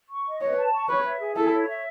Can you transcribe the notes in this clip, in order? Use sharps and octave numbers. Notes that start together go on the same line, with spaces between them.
C#6
D#5
B4 C#5
A5
C#6
B4 C#5
E5
G#4
E4 A4
C#5
E5